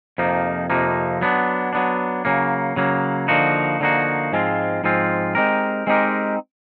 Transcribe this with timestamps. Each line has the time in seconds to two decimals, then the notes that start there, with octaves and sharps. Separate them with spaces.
0.18 F2 C3 F3 A#3 D#4
0.70 F2 C3 F3 A#3 D#4
1.21 F#3 B3 D4
1.73 F#3 B3 D4
2.25 C#3 F#3 A#3
2.76 C#3 F#3 A#3
3.28 D3 F3 A#3 D#4 F#4
3.80 D3 F3 A#3 D#4 F#4
4.32 G#2 F3 G#3 C4 F4
4.84 G#2 F3 G#3 C4 F4
5.35 G#3 C4 D#4 G4 A#4
5.87 G#3 C4 D#4 G4 A#4